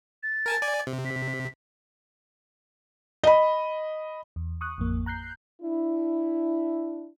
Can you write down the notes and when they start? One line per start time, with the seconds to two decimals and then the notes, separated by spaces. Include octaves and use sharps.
0.23 A6
0.46 A#4 G#5 A5
0.62 D5 G#5
0.87 C3
1.05 B6
3.23 D#5 B5
4.36 E2
4.61 C#6 D#6 F#6
4.78 A1 F2 A#3
5.06 A#5 F#6 G6 C7
5.62 D4 E4